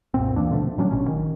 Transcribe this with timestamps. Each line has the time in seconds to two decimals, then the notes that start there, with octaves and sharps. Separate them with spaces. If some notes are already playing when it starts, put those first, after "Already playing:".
0.14 C2 F#2 A#2 C4
0.36 D#2 E3 A#3 D4
0.51 B2 D3 F3 A3
0.78 A2 F#3 C#4 D4
0.91 A1 B2 C#4
1.08 D#3